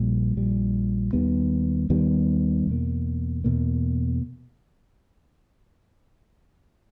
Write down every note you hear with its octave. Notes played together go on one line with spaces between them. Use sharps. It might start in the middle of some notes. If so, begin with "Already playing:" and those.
Already playing: A#1 A#2 G3
A#1 A#2 G3
D#2 D#3 G3 B3
D#2 D#3 G3 B3
E2 B2 A#3
E2 B2 A#3